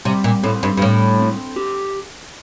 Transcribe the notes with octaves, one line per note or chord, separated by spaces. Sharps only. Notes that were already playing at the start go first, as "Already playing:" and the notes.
C3 G3
A#2
A2 C4
G2
G2
A2 G3
C4
G4